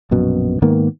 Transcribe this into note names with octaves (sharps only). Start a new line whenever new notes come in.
A#1 F#2 B2
G#2 D#3 A#3 B3